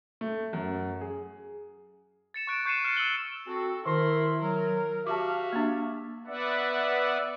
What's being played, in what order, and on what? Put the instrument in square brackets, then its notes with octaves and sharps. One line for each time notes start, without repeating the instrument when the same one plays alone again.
[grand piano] A3
F#2
G#4
[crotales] A6 C#7 E7
C#6 F#6 D7
C#6 G6 C7 C#7 D#7 E7
F6 F#6 A6 C7 C#7 E7
E6 C#7 F#7 G7
[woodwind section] C4 F#4 [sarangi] A4
[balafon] D#3 [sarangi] E4 [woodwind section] A#4 C6
[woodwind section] F#3 [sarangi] A#4
[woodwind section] F#4 G4 E5 [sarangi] F5 [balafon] A5 D6
[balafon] A#3 D4
[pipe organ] B3 B4 D5 E5 F#5